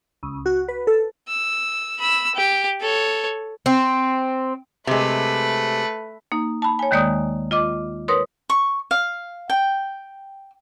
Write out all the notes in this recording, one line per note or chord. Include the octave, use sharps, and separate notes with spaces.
C#2
F#4
B4
A4
E6
B5 E6
G4
A4 C#5
C4
C3 G#3 A3 B4
A#3 D#4
A5 B5
C#5 G#5
D#2 D#3 G#3 A#3 D5 D#6
F4 D#5 D6
A#4 B4 C#5 C6 D#6
C#6
F5
G5